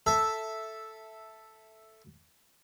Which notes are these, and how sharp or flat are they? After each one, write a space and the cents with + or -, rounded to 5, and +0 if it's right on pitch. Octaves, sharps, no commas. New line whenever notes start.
A4 +0 E5 +0